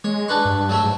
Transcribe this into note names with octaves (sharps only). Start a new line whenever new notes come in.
G#3 C#5
D4 B4 C#6
G2
F#3 A3 E5
G#2